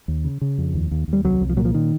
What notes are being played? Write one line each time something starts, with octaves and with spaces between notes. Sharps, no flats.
D#2
C#3
C#3
F2
D#2
D#2
D#2
G3
C2 F#3
C2
F3
A#2 F#3
F3
D#3